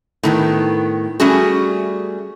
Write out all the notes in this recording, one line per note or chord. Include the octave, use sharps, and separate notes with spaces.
A2 D#3 B3
G3 A3 C#4 F#4 G#4